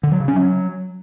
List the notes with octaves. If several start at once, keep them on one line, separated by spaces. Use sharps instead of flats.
D3
F#3
C#3
C#4
F#3